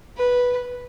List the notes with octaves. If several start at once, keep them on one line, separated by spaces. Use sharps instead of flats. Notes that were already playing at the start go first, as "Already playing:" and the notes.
B4